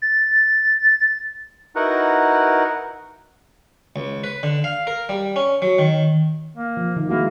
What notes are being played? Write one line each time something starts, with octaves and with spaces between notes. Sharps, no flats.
A6
D#4 E4 F#4 A#4 B4 F#5
C#2
B4
D3
F5
A#4
G3
C#4
F#3
D#3
A#3
F3
D#3
G#3 A#3 E4 F#4